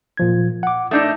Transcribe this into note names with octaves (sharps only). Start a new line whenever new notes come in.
A#2 F3 G#6
F#5 D6
A3 D4 D#4 D#6 G6